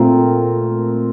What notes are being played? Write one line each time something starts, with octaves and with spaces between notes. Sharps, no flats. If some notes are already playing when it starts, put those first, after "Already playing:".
Already playing: A#2 A3 C4 F4 A#4